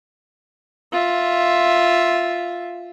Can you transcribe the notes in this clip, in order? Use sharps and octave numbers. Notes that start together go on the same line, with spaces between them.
F4 E5